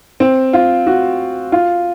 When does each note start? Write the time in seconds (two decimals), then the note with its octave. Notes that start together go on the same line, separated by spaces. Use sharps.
0.20 C4
0.53 F4
0.87 F#4
1.52 F4